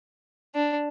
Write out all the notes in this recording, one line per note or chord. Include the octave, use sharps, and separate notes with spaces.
D4